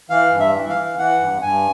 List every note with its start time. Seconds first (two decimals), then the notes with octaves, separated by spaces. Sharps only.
0.10 E3 F5
0.32 G2
0.39 E5
0.54 E3
0.69 F5
0.76 E3
0.98 E3 F#5
1.20 G2
1.41 G2 G#5